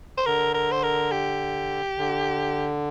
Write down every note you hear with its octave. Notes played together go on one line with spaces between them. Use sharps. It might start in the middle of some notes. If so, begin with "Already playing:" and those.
C5
D3 A#4
A#4
C5
A#4
G4
D3